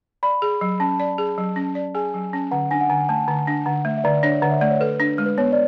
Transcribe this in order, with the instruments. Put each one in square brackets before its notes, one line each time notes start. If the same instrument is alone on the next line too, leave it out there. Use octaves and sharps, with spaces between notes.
[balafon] D5 [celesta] B5
[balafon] G#4
F#3
[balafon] C#4 [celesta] A5
[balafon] D5
G#4
F#3
C#4
D5
[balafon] G#4 [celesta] G#5
[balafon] F#3
C#4
[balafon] D3 [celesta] F#5
[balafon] D4 [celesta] G#5
[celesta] F#5
[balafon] D3 [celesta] G#5
[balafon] A3 [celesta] A5
[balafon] D3
D4
[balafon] D3 [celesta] F#5
[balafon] A3 [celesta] E5
[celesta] E5
[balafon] D3 [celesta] D5
[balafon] D4 [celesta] C#5
[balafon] D3 [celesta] F#5
[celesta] E5
[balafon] A3 [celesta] D5
[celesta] C#5
[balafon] A4 [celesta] B4
[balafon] D4
G#3
[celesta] B4
[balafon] B3 [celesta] C#5
[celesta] D5